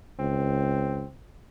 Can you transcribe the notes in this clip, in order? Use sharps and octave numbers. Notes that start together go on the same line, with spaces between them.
C#2 C4